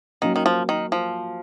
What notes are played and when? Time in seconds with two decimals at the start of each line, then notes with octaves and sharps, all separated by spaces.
0.22 D#3 F#3 A#3 C#4
0.36 D#3
0.46 F3
0.69 D#3
0.92 F3